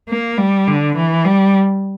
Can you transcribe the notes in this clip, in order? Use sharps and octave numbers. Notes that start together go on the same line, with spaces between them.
A#3
G3
D3
E3
G3